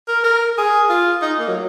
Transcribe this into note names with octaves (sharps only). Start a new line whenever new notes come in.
A#4
A#4
G#4
F4
D#4
A#3
F#3